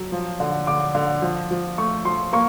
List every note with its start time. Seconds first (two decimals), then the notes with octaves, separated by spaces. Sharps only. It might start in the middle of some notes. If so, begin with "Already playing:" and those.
Already playing: F#3
0.12 F3
0.40 D3
0.67 D3 D6
0.95 D3
1.22 F3
1.51 F3
1.78 A3 C#6
2.05 F3 C6
2.33 A#3 C#6